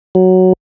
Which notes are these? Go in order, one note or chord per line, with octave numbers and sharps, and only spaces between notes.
F#3